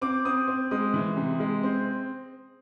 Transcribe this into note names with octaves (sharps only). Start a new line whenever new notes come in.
C4 D6
C4 D#6
C4
G#3 D#6
E3
C3
G#3
C4